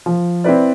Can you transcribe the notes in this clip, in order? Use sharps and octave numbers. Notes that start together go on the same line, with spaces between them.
F3
C4 E4 B4 D5